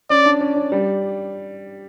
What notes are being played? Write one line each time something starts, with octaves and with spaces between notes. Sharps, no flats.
C#4 D5
D4
C#4
C#4
G3